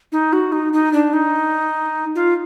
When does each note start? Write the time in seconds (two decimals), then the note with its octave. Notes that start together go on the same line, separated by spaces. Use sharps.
0.12 D#4
0.33 F#4
0.52 D#4
0.73 D#4
0.93 D4
1.13 D#4
2.15 F4